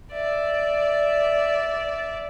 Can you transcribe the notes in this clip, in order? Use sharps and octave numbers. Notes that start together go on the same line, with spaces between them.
D5 E5